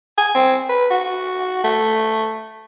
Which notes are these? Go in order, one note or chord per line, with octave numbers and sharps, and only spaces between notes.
G#5
C4
B4
F#4
A3